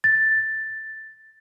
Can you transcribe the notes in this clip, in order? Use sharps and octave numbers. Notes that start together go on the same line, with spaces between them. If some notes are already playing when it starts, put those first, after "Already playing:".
A6